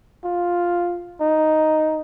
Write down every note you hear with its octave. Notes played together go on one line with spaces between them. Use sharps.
F4
D#4